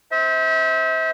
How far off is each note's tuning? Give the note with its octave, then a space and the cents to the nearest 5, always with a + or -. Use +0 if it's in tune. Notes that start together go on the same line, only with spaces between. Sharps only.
C5 +0 E5 -35